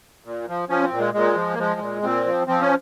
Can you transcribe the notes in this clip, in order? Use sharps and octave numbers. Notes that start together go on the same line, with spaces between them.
A#2
F3
F3 C#4
C4
A#2
G#3
A#2 G#3
F3
A#3
F3 G#3
A#2
A#2 C4
F3
F3 C4
C#4